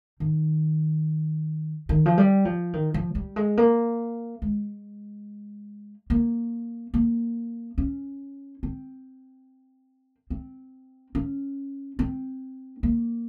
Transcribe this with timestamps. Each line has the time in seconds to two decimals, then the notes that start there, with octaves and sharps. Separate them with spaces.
0.20 D#3
1.89 D#3
2.06 F3
2.18 G3
2.45 F3
2.73 D#3
2.94 F3
3.15 G3
3.36 G#3
3.57 A#3
4.42 G#3
6.10 A#3
6.94 A#3
7.78 C#4
8.63 C4
10.30 C4
11.15 C#4
11.99 C4
12.83 A#3